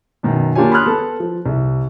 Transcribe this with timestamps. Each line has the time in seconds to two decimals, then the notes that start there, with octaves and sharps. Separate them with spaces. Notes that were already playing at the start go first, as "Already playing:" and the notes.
0.23 F#2 B2 D#3
0.55 A#3 D4 F4 G4 C#5 G#5
0.72 B5 C6 D#6 F6 F#6
0.86 B3 A4
1.20 F3
1.46 C2